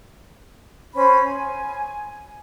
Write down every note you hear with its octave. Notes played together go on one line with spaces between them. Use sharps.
C#4 C5 B5
G#5